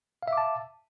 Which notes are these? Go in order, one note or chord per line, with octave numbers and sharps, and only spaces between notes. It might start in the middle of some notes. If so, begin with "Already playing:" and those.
E5 F5 A5 D6